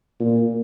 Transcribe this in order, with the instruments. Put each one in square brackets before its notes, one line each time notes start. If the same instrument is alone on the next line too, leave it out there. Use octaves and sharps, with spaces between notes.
[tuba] A#2